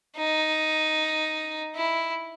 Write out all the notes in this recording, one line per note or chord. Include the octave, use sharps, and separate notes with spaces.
D#4
E4